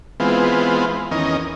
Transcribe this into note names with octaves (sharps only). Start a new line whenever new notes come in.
E3 G#3 B3 C4 F4
E2 D#3 C#4 A#4 D#5